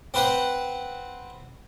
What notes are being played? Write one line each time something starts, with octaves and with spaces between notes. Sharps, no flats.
C4 B4 C5 F#5